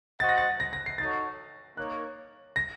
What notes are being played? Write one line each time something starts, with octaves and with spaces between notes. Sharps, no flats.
F#4 C5 D#5 F#5 A6
A#6
A6
A#6
A#6
C7
D#4 F#4 A4 C#5 F#5 A6
A#3 D#4 A#4 C#5 F#6
A#6